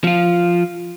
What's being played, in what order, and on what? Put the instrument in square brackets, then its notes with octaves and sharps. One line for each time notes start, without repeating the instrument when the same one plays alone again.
[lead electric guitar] F3 F4